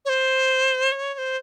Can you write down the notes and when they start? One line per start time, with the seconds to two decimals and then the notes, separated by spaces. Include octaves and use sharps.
0.05 C#5
0.09 C5
0.92 C#5
1.14 C#5
1.18 C5